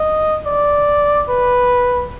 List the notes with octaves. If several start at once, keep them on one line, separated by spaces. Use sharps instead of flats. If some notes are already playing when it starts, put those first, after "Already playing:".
Already playing: D#5
D5
B4